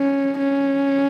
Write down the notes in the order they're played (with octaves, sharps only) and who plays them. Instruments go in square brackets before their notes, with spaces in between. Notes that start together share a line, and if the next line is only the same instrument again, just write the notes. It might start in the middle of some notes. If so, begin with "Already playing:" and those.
Already playing: [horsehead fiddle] C#4
C#4